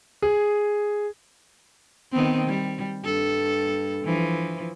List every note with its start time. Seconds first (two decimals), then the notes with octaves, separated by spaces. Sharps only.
0.22 G#4
2.12 D#3 B3 C4
2.47 G3
3.04 G2 A4
4.04 E3 F3